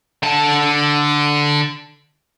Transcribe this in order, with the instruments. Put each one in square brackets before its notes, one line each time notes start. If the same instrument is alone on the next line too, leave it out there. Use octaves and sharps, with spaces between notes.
[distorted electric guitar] D3 A5